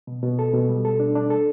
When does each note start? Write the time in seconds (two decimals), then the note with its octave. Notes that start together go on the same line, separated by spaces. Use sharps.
0.07 B2
0.23 B2
0.39 A4
0.53 B2
0.69 G3
0.85 A4
1.00 D4
1.15 D4
1.30 A4